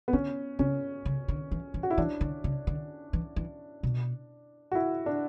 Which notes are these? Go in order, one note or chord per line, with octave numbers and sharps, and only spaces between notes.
B3
D3 C#4
C#3 C#4
C#3
D3
E3
E3
F#4
E4
E3 D4
D3
C#3
D3
E3
E3
B2
F#4
E4
D4